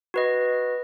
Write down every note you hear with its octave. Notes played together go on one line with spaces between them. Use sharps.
F#4 B4 D#5